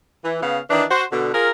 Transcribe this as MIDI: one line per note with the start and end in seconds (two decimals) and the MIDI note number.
0.23 0.38 52
0.42 0.59 49
0.42 0.59 59
0.42 0.59 77
0.69 0.83 51
0.69 0.83 52
0.69 0.83 62
0.90 1.03 66
0.90 1.03 72
1.11 1.29 47
1.11 1.29 50
1.33 1.49 65
1.33 1.49 68
1.33 1.49 70